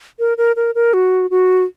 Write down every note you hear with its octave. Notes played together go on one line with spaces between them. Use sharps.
A#4
A#4
A#4
A#4
F#4
F#4